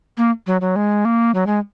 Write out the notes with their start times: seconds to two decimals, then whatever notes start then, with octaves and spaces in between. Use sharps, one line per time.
0.17 A#3
0.47 F#3
0.61 F#3
0.76 G#3
1.05 A#3
1.34 F#3
1.46 G#3